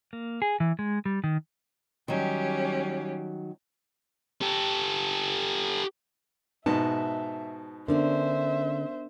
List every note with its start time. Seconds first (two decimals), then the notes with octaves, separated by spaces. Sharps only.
0.13 A#3
0.42 G#4
0.60 E3
0.79 G#3
1.06 G3
1.24 D#3
2.08 D#3 F#3 G3 C#4 G4
4.41 G4 A4
6.66 G#2 B2 E5 A5
7.88 D3 B3 C#4 D4 A#4 C5 D5 E5